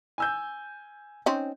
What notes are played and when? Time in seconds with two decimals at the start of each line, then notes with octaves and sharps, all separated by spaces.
0.18 G#5 E6 G6
1.26 C4 C#4 D#4